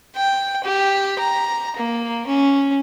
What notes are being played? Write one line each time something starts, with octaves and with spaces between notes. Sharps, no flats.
G5
G4
A#5
A#3
C#4